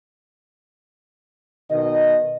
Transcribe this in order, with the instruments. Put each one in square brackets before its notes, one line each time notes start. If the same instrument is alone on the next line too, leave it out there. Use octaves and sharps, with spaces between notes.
[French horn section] B2 D#3 D#5